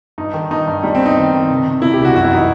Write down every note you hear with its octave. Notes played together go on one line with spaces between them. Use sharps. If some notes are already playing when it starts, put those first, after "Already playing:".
G2 D#4
D#3
G2 D#4
G2
G3 D#4
C4
B3
D#4
D#3
D#3
C3
C3
C3 E4
G4
C2
F#4
F#2 F#4
E4
E3 D#4